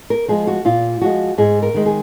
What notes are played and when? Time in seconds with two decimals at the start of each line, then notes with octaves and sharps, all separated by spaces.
0.10 A#4
0.28 F3 G#3 G#4
0.47 F#4
0.65 A#2 F4
1.01 F3 G#3 F#4
1.38 G#2 G#4
1.62 A#4
1.74 D#3 G#3
1.86 G#4